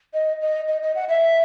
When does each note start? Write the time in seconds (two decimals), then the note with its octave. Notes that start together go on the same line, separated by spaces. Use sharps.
0.14 D#5
0.42 D#5
0.68 D#5
0.82 D#5
0.95 F#5
1.09 E5